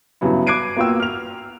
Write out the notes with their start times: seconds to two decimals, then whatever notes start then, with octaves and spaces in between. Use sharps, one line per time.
0.21 G2 C#3 F#3 B3 E4
0.47 D6 F#6 G#6 C7 D7 D#7
0.76 A#3 B3 F4 F#4 G5 E6
1.00 F6 F7